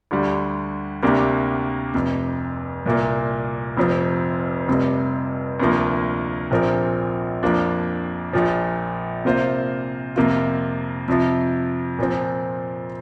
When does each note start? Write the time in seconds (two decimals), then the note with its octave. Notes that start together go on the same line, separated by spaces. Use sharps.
0.11 D2 D3 G3
1.03 D2 C3 A#3 D4 G4
1.94 F1 F2 C3
2.86 C2 A#2 A#3
3.77 F1 F2 F3 C4
4.68 F1 F2 C3 G3
5.60 D2 C3 F3 A#3
6.51 A#1 A#2 F3 C4 A#4
7.42 F2 F3 A#3 D4 F4
8.33 A#1 A#2 F3
9.25 C3 A#3 F4 C5
10.16 F2 C3 A#3 F4
11.08 F2 C3 F3
11.99 A#2 F3 C4